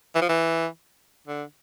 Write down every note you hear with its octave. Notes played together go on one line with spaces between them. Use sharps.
E3
F3
E3
D3